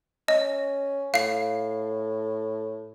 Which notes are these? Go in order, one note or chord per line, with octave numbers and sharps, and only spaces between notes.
C#4 D#5
A2 F5 C7